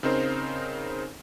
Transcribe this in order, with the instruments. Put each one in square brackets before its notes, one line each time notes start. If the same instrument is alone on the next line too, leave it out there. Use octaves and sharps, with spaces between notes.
[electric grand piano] C#3 C4 D#4 A#4 C5